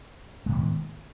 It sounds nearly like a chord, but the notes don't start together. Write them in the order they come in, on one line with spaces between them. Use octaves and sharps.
G#3 A2 D#3 B3